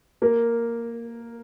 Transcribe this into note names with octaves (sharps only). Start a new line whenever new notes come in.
A#3 A#4